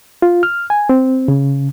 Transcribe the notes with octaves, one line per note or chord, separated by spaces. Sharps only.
F4
F6
G#5
C4
C#3